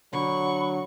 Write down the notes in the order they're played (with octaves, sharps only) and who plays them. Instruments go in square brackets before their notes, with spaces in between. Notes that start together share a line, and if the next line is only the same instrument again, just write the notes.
[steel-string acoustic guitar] D3 [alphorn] F#3 [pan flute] B5 [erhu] C#6